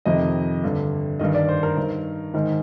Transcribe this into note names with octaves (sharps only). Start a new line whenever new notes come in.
F2 C3 D#3 D#5
G2 D3
G2 D#3 D#5
D5
C5
A#4
G2 D#3
G#2 D#3